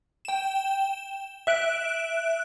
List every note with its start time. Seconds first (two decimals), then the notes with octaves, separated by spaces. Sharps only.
0.25 G5 E7
1.47 E5 F#6 D7